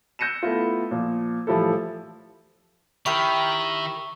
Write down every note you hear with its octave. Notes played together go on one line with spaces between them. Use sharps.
E6 G6 A#6 C#7 D#7 E7
A3 B3 E4 F4
A#2 F3
A2 E3 F3 G3 E4 A4
D#3 E4 G4 A#4 E5 C#6